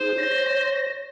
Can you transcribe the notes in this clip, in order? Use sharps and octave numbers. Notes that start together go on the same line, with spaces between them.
D#4 G#4 C5
C#5 A#6